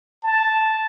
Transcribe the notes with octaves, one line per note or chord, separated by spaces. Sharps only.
A5